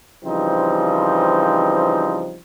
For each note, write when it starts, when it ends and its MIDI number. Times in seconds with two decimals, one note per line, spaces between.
0.24 2.37 49
0.24 2.37 52
0.24 2.37 53
0.24 2.37 55
0.24 2.37 60
0.24 2.37 63